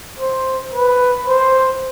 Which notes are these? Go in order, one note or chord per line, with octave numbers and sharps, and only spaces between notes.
C5
B4
C5